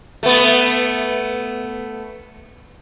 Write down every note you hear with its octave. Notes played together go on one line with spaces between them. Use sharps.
A3 B3